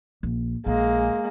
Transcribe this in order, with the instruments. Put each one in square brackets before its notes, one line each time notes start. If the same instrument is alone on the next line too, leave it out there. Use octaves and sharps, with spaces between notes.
[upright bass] A#1
[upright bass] A#1 [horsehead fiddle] G#3 A#3